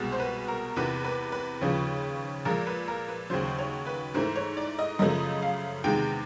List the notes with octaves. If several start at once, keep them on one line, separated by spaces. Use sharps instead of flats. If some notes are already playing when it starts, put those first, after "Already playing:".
Already playing: C2 B2 G#3
C5
B4
A#4
E2 C3 E3 B4
B4
B4
D#2 C#3 F3
A#2 F3 G#3 A#4
B4
A#4
B4
D#2 C#3 F#3 C5
C#5
B4
G#2 E3 A3 C5
C#5
D5
D#5
F#2 C#3 F3 A3 D#5
F5
E2 C3 D#3 G#3 G5